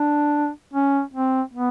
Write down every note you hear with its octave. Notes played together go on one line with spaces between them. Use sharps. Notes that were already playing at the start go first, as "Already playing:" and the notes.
Already playing: D4
C#4
C4
B3